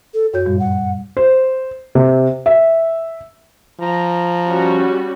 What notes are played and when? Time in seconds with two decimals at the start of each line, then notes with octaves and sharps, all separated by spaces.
0.14 A4
0.33 F#2 F#4 C#5 G6
0.45 G2 A#2 G3
0.60 F#5
1.17 C5
1.95 C3
2.46 E5
3.80 F3 A#5
4.48 G3 C#4 F#4